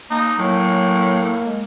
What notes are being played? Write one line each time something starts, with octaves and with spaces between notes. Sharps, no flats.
A#3 D#4
A2 F#3 A#3
G#3